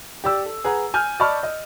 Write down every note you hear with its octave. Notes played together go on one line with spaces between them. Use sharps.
G4 D5 E6
A4
G#4 B4 F#5 A#5
G#5 F6 G6
D5 D#5 A5 B5 C#6 F6
D#5